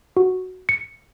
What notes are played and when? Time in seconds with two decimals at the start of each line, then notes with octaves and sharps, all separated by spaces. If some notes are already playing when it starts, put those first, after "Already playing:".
0.17 F#4
0.69 C#7